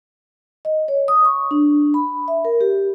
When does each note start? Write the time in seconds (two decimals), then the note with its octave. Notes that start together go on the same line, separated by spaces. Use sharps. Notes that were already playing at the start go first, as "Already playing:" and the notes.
0.65 D#5
0.88 C#5
1.08 D#6
1.25 C#6
1.51 D4
1.94 B5
2.28 E5
2.45 A#4
2.61 G4